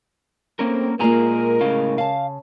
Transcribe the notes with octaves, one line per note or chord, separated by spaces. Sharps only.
A3 A#3 C4 C#4 A#4
A#2 G#3 A#3 F4 G#4 A#4 G#5 A#5
A2 C#3 F5
C#3 F5 A5